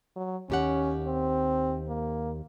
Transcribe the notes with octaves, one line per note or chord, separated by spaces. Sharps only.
F#3
D#2 C#4 G4 F#5
C4
A#3